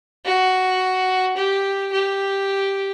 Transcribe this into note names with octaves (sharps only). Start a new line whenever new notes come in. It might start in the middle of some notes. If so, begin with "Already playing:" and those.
F#4
G4
G4